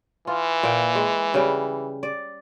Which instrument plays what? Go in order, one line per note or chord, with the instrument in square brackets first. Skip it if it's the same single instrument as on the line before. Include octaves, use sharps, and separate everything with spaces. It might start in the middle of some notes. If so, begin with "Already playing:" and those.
[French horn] E3 [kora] F4
[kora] A#2 G5
G#3
C#3 G3
D5